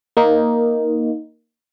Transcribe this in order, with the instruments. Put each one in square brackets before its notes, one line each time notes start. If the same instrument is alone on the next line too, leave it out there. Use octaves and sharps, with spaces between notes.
[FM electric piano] A#3 D#4